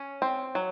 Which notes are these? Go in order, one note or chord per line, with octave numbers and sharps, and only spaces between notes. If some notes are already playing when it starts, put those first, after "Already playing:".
Already playing: C#4
C4
F#3